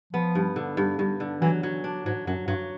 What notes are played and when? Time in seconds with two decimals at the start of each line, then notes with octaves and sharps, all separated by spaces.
0.13 F3 B3
0.35 G2
0.56 D3
0.77 G2
0.99 G2
1.20 D3
1.41 E3 F#3
1.63 F#3
1.84 D4
2.06 G#2 F#3
2.27 F#2 F#3
2.48 G2 F#3